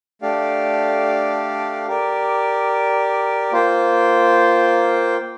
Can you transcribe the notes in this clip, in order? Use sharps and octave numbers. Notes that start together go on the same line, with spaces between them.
A3 D4 G4 D5 F5
G4 A#4 D5
A#3 F4 C5 G5